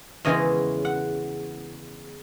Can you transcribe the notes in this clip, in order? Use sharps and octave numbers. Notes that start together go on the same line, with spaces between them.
E2 C#3 E3 G#3 C#4 D#5
F#5